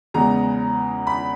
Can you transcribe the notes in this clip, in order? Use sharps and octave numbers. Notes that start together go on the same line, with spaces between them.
E2 C#3 G#3 B3 A#5
B5